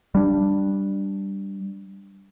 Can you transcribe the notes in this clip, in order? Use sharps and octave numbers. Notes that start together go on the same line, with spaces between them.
G3 D4